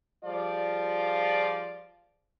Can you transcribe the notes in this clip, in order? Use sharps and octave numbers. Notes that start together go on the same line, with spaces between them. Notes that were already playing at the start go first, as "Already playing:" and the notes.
F3 G3 F4 G#4 D5